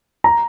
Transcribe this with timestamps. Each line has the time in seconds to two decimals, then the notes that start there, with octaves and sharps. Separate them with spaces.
0.24 A#5